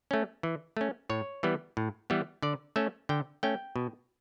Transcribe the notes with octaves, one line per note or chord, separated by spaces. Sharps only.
A3 C#4
E3
A3 C#4
A2 C#5
E3 G3 B3
A2
E3 G3 B3
D3 D5
A3 C#4 E5
D3 G5
A3 C#4 G5
B2